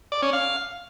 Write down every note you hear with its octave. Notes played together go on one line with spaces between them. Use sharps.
D5
C#4
F5